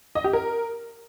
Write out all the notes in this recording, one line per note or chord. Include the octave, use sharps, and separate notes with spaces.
D#5
G4
A#4